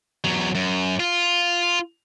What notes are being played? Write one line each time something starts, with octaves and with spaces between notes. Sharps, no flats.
E2 F#3
F#2
F4